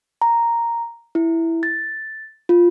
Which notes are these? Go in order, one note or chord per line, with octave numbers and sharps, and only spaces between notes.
A#5
E4
A6
F4